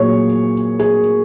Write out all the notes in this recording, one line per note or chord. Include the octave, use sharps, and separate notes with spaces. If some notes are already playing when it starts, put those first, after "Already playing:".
Already playing: A#2 F#3 G#4 C#5
G#4